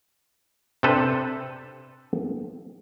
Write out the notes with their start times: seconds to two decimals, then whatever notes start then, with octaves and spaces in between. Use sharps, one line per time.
0.83 C3 C4 D4 A4 B4 C5